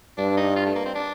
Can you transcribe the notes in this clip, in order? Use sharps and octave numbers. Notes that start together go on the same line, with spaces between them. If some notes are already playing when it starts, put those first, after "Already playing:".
G2 D4
D#4
F4
A3
A#3
C4
D4